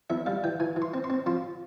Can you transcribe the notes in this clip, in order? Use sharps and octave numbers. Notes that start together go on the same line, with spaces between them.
E2 E5
G3 F5
E3 G5
E3 G#5
E3
C6
C4
C6
C4
F3 C6